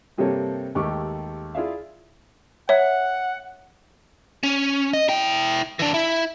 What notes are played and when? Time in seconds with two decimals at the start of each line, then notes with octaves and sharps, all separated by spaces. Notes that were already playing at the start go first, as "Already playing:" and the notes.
0.18 G2 C3 G3 A#3 A4 C#5
0.75 D#2 G#3 A3 G4 C#6 D6
1.55 E4 F4 G#4 D5 E5 F5
2.69 C#5 E5 F#5
4.43 C#4
4.93 D#5
5.09 E4 G5
5.79 E3 D4
5.94 E4